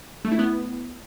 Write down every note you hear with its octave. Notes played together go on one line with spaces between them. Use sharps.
A3
E4
B3